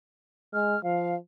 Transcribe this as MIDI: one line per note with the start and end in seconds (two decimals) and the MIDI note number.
0.53 0.76 56
0.53 0.82 89
0.84 1.17 53
0.84 1.15 77